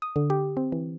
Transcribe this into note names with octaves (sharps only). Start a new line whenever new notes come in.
D#6
D3
G4
C4
E3